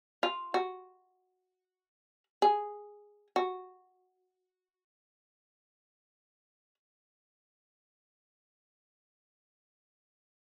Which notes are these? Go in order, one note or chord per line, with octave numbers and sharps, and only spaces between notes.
F4
F#4
G#4
F#4